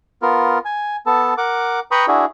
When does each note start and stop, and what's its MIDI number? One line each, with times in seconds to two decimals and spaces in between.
0.22 0.58 59
0.22 0.58 65
0.22 0.58 70
0.65 0.96 80
1.06 1.34 59
1.06 1.34 69
1.06 1.34 81
1.38 1.80 70
1.38 1.80 78
1.38 1.80 86
1.91 2.06 71
1.91 2.06 79
1.91 2.06 82
1.91 2.06 83
1.91 2.06 85
1.91 2.06 87
2.08 2.25 62
2.08 2.25 64
2.08 2.25 66
2.08 2.25 68